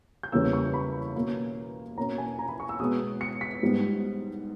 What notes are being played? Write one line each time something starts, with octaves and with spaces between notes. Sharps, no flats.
G6
E2 C#3 G3 A#3 C#4 E6
C#6
B5
B2 A#3 C#4
B2 A#3 C#4 A#5
G#5
A#5
B5
C#6
E6
B2 G#3 B3 D#6
C#7
B6
G#2 G3 B3